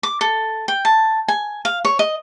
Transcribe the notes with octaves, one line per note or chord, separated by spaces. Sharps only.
D6
A4
G5
A5
G#5
F5
C#5
D#5